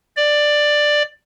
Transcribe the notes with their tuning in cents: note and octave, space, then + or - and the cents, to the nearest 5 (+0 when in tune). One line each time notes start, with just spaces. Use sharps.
D5 +10